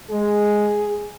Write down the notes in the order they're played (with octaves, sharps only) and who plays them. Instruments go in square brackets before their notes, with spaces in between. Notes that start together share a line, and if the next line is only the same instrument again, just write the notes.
[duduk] G#3 [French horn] G#4